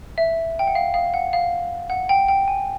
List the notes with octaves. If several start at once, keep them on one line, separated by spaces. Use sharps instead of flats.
E5
G5
F#5
F5
F5
F#5
F5
F#5
G5
G5
G#5